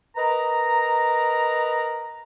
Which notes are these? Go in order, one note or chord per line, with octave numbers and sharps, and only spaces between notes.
A#4 B4 D#5 A#5